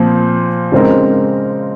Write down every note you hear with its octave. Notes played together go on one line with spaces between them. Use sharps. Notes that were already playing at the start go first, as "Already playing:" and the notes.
Already playing: A#2 F3 C4
C#3 G#3 C4 D#4 A#4